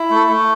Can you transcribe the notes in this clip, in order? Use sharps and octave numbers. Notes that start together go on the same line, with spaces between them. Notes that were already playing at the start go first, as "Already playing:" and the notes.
Already playing: E4
A3
A4
A3